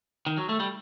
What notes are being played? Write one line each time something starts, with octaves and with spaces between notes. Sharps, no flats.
D#3
F#3
A3
G3